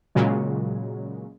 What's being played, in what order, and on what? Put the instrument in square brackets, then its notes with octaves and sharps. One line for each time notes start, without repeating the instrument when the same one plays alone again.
[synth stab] A#2 C#3 F#3 G#3